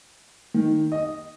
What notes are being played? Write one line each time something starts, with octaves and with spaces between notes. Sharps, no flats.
D#3
D#5